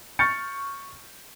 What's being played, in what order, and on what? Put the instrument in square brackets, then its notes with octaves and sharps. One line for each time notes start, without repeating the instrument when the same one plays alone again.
[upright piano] C#6 F6 G6 A6 C#7